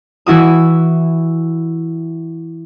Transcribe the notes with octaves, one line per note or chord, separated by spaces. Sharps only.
E3 E4 F#4 D#6